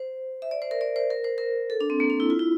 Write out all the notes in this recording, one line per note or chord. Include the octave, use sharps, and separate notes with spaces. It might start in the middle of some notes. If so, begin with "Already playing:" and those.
Already playing: C5
E5
D5
C5
A#4
D5
C5
A#4
C5
A#4
A4
D4
C4
A#3
D4
E4
F4
E4